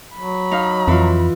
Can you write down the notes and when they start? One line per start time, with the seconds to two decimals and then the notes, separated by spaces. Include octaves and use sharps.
0.16 F#3 B5
0.51 D#4 F5
0.88 F2 E3 F4